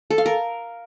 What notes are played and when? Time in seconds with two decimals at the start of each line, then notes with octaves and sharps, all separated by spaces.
0.10 A4
0.18 F5
0.26 A#4